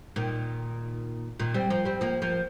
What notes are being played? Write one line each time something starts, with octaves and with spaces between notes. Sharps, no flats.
A#2 D#3
A#2 D#3
G3 C4
F3 A#3
G3 C4
F3 A#3
F3 A#3